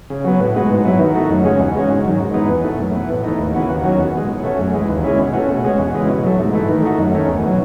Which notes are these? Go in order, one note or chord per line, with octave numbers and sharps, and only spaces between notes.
C#3
F#3 B3
A2
G#3 B3 F#4
G#2
F#3 B3 E4
D#3
A3 D#4 F#4
F#2
C#3 G#3 C#4 F#4
E2
C#3 G#3 C#4 F#4
G#2
D#3 F#3
G#2
E3 G#3 B3 D#4
E2
B2 A3
F#2
E3 B3
A2
E3 A3 D#4
D#2
C#3 E3 B3 F#4
D#2
D#3 F#3 C#4 F#4
E2
B2 G#3
B2
A3 C#4 F#4
F#2
E3 G#3
D#2
C#3 G#3 C#4 E4
B2
A3 C#4 F#4
B2
G#3 C#4 F#4
E2
C#3 E3 G#3
B2
F#3 A3
G#2
E3 A3
D#3
A3 D#4 F#4
F#2
D#3 A3 C#4
E2
B2 F#3